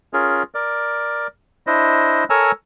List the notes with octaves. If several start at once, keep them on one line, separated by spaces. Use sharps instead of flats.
C#4 F4 G#4 A#4
A#4 D5
D4 E4 C5 D#5
A4 A#4 C#5 G#5 A#5 E6